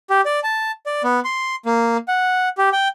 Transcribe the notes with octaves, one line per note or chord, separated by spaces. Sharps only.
G4
D5
A5
D5
B3
C6
A#3
F#5
G4
G5